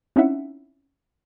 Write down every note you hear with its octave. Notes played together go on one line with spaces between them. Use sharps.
C4 C#4 D#4 E4 E5 F#5